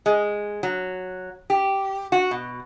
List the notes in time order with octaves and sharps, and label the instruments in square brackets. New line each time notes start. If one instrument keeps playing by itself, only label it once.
[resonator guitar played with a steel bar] G#3
F#3
G4
F#4
B2